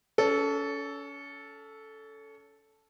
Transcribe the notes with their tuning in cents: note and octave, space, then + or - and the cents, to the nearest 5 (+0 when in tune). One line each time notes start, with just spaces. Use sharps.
C#4 +30 A4 -5